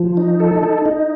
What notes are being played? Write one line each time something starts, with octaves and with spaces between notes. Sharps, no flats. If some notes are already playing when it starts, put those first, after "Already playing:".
Already playing: F3
D#4
A4
D#4
D#4